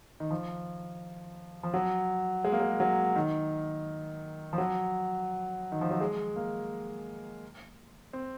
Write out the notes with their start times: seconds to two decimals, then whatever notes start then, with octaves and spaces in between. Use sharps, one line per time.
0.20 D#3
0.31 F3
1.63 F3
1.74 F#3
2.44 G#3
2.52 A#3
2.60 G#3
2.80 F#3
3.16 D#3
4.53 F3
4.58 F#3
5.72 D#3
5.81 F3
5.90 F#3
6.01 G#3
6.36 A#3
8.13 C4